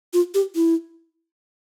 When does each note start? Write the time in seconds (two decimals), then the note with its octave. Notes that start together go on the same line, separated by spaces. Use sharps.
0.13 F4
0.34 G4
0.55 E4